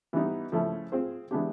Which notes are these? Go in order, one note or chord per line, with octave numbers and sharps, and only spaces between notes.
E3 G3 B3 D#4
C#3 F3 A3 C#4 E4
C4 F4 G#4 C5
E3 G#3 B3 D4 G4